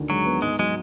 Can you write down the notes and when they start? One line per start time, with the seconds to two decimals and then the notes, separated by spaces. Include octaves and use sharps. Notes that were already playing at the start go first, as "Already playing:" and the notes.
Already playing: D2 D3 D#3
0.10 F#3 G#3
0.26 B3
0.42 G#2 G#3
0.59 F#3 G#3